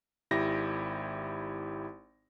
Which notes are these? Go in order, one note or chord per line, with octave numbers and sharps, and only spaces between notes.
G#1 E4 G4 A#6